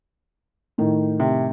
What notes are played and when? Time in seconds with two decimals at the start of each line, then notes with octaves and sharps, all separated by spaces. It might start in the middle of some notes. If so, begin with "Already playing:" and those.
0.78 A2 D#3
1.20 C3